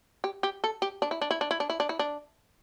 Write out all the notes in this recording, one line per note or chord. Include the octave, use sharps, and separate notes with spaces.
G4
G4
A4
G4
D4
E4
D4
E4
D4
E4
D4
E4
D4
E4
D4